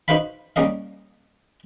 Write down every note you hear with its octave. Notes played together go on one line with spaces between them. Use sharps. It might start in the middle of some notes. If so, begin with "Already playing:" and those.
D#4 F#4 B4 C5 F5 B5
G3 A#3 C#4 A#4 D#5 F5